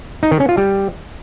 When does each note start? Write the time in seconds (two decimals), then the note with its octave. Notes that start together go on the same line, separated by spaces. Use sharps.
0.23 D#4
0.31 D#3
0.40 C#4
0.49 F4
0.57 G3